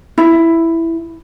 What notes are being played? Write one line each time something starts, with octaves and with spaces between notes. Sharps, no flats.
E4